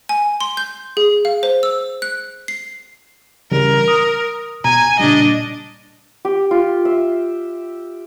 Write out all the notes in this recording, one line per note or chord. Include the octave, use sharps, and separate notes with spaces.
G#5
C6
G6
G#4
F5
C5
E6
F#6
C7
C#3 E3 G3 A#4
D#6
B2 G#5 A#5
A#2 C#3 G3 D4 D#5
G4
F4
E5